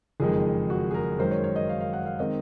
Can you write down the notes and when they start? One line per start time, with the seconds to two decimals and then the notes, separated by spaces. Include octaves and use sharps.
0.20 F#1 F2 D#3 G#3 G#4
0.70 F#4
0.91 G#4
0.94 A#4
1.18 F#2 D#3 G#3 C5
1.31 C#5
1.44 C#5
1.56 D#5
1.69 F5
1.81 F5
1.93 F#5
2.06 F5
2.19 D#3 G#3 C4 D#5